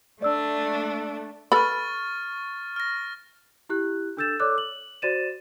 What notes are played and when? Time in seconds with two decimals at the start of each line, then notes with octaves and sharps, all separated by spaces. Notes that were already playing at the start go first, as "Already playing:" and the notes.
0.22 A3 D4 D5 E6
1.52 A4 B4 B5 C#6 F6 A6
2.76 F6 A#6
3.69 E4 G4 F#6
4.17 D4 A4 E6 G6 A6 E7
4.40 A4 C#5 D5 D6 E6 F#6
4.58 F#7
5.02 F#4 C5 D5 A6 D#7 E7